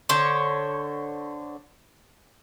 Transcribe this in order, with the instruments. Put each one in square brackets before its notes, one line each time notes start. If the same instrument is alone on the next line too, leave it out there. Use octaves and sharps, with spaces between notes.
[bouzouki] D3 C5 C#5